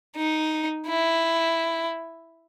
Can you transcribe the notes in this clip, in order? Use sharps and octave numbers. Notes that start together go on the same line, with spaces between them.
D#4
E4